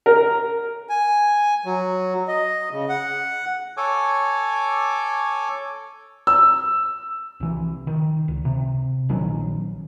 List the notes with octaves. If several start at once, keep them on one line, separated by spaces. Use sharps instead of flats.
A#4
G#5
F#3
D#5
C#3
F#5
A4 C#5 G#5 D6
E6
C2 E3
D#3
C#2
C3
A#1 D#3 F#3 C#4